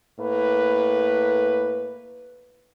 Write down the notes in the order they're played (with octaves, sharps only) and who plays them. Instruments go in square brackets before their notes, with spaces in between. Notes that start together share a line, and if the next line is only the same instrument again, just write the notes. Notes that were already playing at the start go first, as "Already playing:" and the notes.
[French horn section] A2 A#3 B4